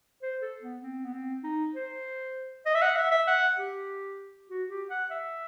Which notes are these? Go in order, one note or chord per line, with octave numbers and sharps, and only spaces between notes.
C5
A4
B3
C4
B3
C4
D#4
C5
D#5
E5
F#5
E5
E5
F#5
G4
F#4
G4
F#5
E5